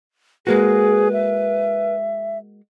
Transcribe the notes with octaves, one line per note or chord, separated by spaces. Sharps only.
G#3 A#3 F#4 G#4 B4
E5